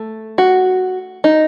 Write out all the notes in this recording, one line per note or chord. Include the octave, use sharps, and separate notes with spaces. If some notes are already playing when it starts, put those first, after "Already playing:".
Already playing: A3
F#4
D#4